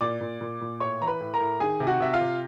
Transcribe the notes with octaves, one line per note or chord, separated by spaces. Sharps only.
A#2 D5 D6
A#2
A#2
A#2
A2 C#5 C#6
E3 A#5
B4 B5
A2
A#4 A#5
A2
D#3 G#4 G#5
C3
F#4 F#5
C3 E5
F4 F5
C3